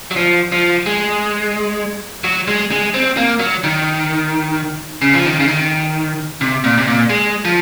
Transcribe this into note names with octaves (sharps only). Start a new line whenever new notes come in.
F#3
F3
F3
G#3
F#3
G#3
G#3
C4
A#3
F#3
D#3
C#3
F3
D#3
C#3
D#3
C3
A#2
C3
A#2
G#3
F3